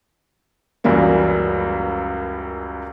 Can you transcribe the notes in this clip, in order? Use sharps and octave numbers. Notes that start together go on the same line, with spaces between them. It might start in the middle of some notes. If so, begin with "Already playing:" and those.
C#2 F#2 E3 F#3 G3 A#3